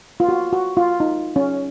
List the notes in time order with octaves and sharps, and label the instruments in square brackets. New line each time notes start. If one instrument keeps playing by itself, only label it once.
[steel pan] F4
F#4
F#4
F4
D#4
C#4